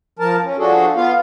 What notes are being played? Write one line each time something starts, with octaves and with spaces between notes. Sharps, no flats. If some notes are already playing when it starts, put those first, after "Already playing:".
F3 A#4 A5
C#4
F3 D4 F#4 G#4 A4
B3 F4 F5